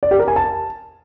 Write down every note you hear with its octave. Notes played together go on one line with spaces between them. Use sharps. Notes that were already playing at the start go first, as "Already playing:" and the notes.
D5
G4
A#4
G#5
A5